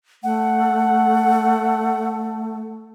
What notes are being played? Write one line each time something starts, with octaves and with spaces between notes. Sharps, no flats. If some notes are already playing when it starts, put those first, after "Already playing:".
A3 F#5